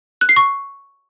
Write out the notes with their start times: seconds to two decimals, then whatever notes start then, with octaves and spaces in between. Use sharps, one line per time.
0.21 F#6
0.29 C7
0.36 C#6